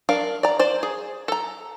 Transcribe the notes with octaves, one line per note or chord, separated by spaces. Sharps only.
D4 A#4 F5
D5 A#5
C5 D5
G#4
A4 A#5